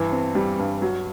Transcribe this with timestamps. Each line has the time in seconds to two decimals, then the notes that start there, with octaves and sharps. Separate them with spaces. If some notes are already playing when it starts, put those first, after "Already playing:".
Already playing: G2 E3
0.12 C4
0.35 G3
0.59 G2
0.82 F#3